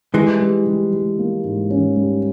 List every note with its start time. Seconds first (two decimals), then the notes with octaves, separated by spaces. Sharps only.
0.14 E3 G3 G#3
0.40 G3
0.66 G3
0.93 G3
1.18 A#3
1.44 G#2
1.70 C#4
1.96 G3